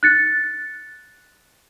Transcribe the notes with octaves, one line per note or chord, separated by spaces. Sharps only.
F#6 A6 C#7